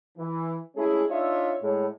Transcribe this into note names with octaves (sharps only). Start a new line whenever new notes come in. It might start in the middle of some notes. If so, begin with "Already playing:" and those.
E3
G#3 A3 C#4 E4 G#4
D4 D#4 F4 C#5 D#5 E5
A2 G#3 C#5